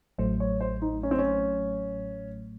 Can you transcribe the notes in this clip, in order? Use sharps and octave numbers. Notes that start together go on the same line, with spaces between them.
A1 A2 F#3 A3 C5
C#5
C5
D#4
C#4
C4
C#4